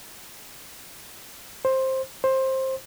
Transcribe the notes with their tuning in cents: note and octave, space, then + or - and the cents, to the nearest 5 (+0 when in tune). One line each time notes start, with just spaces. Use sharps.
C5 +10
C5 +15